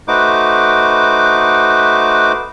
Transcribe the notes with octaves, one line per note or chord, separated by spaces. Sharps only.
A3 D#4 F#4 B4 C5 D6